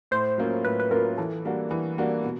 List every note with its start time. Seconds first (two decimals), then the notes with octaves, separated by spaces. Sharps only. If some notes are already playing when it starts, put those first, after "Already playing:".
0.11 A2 C5
0.38 F#3 A#3 C#4 F4
0.64 A2 B4
0.80 B4
0.91 F#3 A#3 C#4 F4 A#4
1.18 E3 A4
1.45 G3 A#3 D4 F#4
1.71 E3
1.98 G3 A#3 D4 F#4
2.24 B2